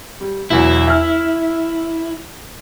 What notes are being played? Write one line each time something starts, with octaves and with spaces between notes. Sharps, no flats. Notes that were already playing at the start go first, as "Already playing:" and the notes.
G3
E1 E2 F#3 E4
E5 F6